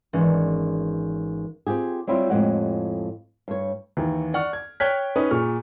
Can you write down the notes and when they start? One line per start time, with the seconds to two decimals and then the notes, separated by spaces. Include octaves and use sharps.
0.13 G#1 E3 C#4 D5
1.67 C4 F4 G4 G#4
2.07 F#3 G3 C4 E4 F4
2.30 F2 A2 G#3 G4 F#5
3.48 G2 C#5
3.97 D#2 E3
4.34 D5 F#5 C#6 F6
4.53 G#6
4.80 C#5 G5 F6 F#6 G#6 B6
5.16 C#4 D#4 B4 D#6
5.31 A#2 G#4 C#6 F6